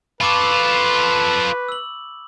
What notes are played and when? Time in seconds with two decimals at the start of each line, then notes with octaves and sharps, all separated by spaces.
0.21 F4 A4 B4 B5 C#6 D6
1.68 E6 F#7